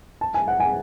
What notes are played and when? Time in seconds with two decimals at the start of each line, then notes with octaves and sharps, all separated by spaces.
0.21 A5
0.34 G#5
0.48 F#5
0.60 G#5